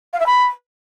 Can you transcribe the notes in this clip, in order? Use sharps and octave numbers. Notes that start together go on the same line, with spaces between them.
F5
E5
B5